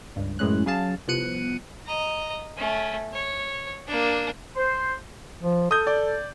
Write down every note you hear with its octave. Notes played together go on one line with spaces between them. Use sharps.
C#2 G2
F#2 A2 E3 G#3 C#4 F#6
C#3 F#3 G#4 F5 A5
C2 F3 B3 F#6 C#7 D#7
D#5 A#5
A3 C#4
C#5
A#3 D4
C5
F3
A4 D#6 G6
D5